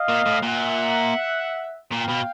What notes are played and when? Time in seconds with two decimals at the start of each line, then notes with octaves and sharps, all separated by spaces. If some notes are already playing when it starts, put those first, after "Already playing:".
Already playing: D#5 F5
0.09 A#2
0.26 A2
0.42 A#2 E5 F#5
1.92 A#2 F5 G5
2.09 B2